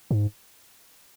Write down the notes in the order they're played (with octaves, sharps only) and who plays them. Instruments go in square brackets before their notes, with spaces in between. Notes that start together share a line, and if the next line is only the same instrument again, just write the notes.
[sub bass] G#2